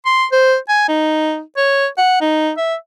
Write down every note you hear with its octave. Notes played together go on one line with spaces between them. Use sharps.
C6
C5
G#5
D#4
C#5
F#5
D#4
E5